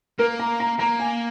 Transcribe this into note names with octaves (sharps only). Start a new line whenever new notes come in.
A#3 A#4
A#5
A#5
A#3 A#5
G#5